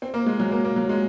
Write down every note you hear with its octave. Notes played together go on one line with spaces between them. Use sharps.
C4
A#3
G#3
F#3
A#3
A#3
F#3
G#3